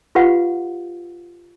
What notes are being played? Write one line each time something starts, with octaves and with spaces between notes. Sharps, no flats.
F4 G4 B4 F5 F#5